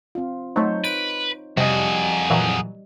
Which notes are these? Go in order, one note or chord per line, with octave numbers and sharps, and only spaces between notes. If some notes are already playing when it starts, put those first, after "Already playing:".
C4 F4
F#3 A3 D#4 C5 C#5
B4 D7
F2 C3 G3 F#4 G#4 D#5
A#2 E3 F#3